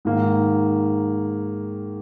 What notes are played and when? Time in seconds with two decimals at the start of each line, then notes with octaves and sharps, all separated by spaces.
0.05 G#2 D#3 A#3